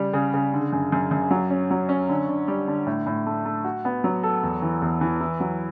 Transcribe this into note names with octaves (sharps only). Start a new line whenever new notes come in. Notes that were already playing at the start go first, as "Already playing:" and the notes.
Already playing: C#3 G3
C#3
C#3
D3
F#2
F#2
F#2
F#3
C#4
F#3
C#4
D3
D3
G3
D3
A2
A2
A3
A3
F#4
B3
F#3
A4
E2
E3
E2
E3
E4
F#3